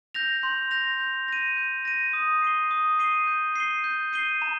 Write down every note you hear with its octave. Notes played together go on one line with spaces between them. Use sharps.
G6 A#6 F7
C6
G6 A#6 F7
G6
A#6 D#7
G6
A#6 D#7
D#6
C7 D#7 G7
D#6
C7 D#7 G7
G6
C7 D#7 G7
G6
C7 D#7 G7
A#5